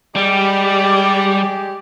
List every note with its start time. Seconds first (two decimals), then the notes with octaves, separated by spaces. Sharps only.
0.15 G3 G#3 G4 D5